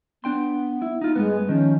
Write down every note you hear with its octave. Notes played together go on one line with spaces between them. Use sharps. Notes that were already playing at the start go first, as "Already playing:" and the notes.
B3 D4 G5 C6
E4
D#4 F4
G2 G#3 B3
D#3 F3 C#4